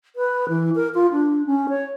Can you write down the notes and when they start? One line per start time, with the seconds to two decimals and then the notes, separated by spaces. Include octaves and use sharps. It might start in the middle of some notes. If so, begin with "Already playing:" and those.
0.16 B4
0.49 E3
0.75 A#4
0.94 F4
1.11 D4
1.46 C#4
1.69 C#5